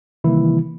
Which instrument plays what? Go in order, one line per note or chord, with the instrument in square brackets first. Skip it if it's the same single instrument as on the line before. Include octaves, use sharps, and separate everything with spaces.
[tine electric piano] C3 D#3 E3 G3 A#3 E4